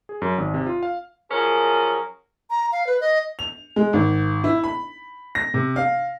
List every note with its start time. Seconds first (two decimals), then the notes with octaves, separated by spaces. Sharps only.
0.09 G#4
0.22 F#2
0.38 G#1
0.54 C3
0.67 F4
0.83 F5
1.31 F3 F#3 C#4 G#4 A#4
2.50 A#5
2.72 F5
2.87 B4
3.01 D#5
3.39 F7
3.76 G#3
3.93 G#1
4.44 E4
4.64 B5
5.35 A#6
5.54 C3
5.76 F5